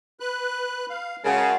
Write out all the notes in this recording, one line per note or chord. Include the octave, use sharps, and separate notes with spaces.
B4 F#6
F5
C#3 F#3 G#3 A#4 F#5 A5